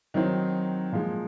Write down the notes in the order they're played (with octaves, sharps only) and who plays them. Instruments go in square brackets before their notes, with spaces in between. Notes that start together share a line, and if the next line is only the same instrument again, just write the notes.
[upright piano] D#3 F#3 C4 D#4
A#2 F3 G#3